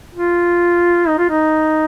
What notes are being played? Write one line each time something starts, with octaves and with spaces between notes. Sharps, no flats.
F4
D#4
F4
D#4